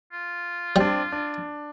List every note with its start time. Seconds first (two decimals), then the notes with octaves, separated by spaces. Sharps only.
0.13 F4
0.76 G3 C4 D4
1.12 D4